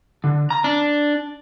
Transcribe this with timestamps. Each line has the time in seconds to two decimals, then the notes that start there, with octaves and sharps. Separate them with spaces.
0.24 D3
0.50 A#5
0.64 D4